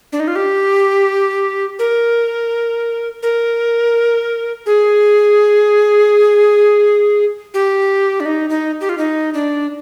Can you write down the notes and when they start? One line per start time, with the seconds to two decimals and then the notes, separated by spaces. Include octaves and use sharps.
0.12 D4
0.20 D#4
0.28 F4
0.36 G4
1.79 A#4
3.23 A#4
4.66 G#4
7.54 G4
8.20 D4
8.26 D#4
8.50 D#4
8.81 G4
8.89 F4
8.98 D#4
9.34 D4